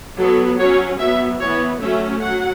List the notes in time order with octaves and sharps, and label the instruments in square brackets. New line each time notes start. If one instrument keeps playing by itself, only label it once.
[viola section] F#3 B3 A4
F#3 C#4 C#5
F#3 B3 E5
E3 B3 C#5
F#3 A3 C#4 E5
F#3 F#5